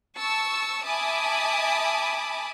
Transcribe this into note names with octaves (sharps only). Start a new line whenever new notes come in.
A5 C#6 E6
E5 G#5 A5 B5 D6 D#6